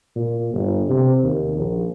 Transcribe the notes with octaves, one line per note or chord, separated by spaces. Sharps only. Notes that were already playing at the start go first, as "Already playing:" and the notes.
A#2
G1
C3
D#2
A#1